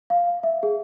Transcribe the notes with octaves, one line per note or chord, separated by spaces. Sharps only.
F5
E5
G#4